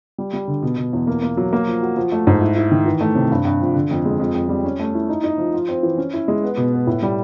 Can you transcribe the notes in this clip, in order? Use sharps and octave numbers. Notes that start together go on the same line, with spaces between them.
G3
G3
D3
B2
B2
E2
A#3
A#3
F#3
A#3
F3
F#4
F3
A3
G#2
E4
E4
D#3
E3
A3
C3
G2
G2
F3
D3
F2
G#3
F2
F2
G3
C#4
A3
E4
D#4
D#4
F3
F4
C4
E3
C#4
E4
G#3
B3
B2
B3
A2
G3